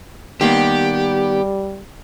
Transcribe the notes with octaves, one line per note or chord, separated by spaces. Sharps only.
D#3 G3 A#3 B3 G4